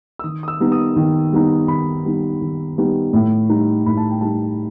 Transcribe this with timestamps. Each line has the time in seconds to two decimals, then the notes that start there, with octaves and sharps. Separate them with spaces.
0.19 E6
0.24 D#3 D#6
0.43 D#6
0.48 E6
0.60 G3 B3 D#4
0.72 D#6
0.96 D#3
1.33 G3 B3 D#4
1.68 D#3 B5
2.05 G3 B3 D#4
2.42 D#3
2.78 G3 B3 D#4
3.13 A2
3.49 G3 D#4
3.86 A2 B5
3.97 A5
4.09 G5
4.21 G3 D#4 A5